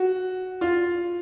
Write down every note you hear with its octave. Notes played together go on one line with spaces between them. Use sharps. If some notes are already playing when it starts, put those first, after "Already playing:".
Already playing: F#4
F4